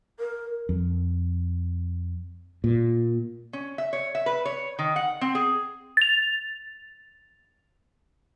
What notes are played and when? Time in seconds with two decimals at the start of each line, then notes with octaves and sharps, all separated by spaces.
0.20 A#4
0.69 F2
2.64 A#2
3.53 C#4
3.78 E5
3.93 C#5
4.15 E5
4.26 B4
4.45 C#5
4.79 D#3
4.96 F#5
5.21 C4
5.35 G#4
5.97 A6 F7